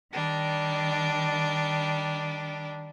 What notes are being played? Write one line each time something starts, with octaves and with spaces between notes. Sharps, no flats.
D#3 G3 D4